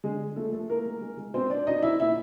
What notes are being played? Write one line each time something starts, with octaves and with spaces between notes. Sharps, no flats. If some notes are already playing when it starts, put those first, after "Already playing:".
D3 G#3 G#4
D3
F3 A3 A4
A3 A4
A#3 E4 A#4
G#3
G#3
G#3
B2 C4 C5
D4 D5
B2 D#4 D#5
B2 E4 E5
A#2 E4 E5